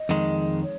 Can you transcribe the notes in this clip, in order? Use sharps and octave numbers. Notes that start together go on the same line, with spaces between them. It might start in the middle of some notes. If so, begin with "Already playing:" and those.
Already playing: D#5
F2 D#3 G#3
C#5